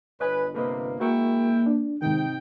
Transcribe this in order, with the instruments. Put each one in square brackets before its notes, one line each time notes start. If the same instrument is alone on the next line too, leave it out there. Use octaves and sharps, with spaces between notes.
[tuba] G1 [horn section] B4 [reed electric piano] C#5 D#5 G#5
[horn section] C3 A#3 [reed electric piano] A4 B4 D#5
[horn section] G#3 E4 G5 [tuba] A#3 [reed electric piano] F#4 A#4 C#6
[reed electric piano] D4
[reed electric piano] G#2 D#3 [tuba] C3 [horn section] D#4 G5